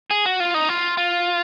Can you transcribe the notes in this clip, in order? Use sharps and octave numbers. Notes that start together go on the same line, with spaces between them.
G#4
F#4
F4
D#4
F4
F4